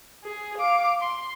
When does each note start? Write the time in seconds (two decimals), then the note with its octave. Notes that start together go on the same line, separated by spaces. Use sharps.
0.24 G#4
0.58 F5 D6
1.00 C6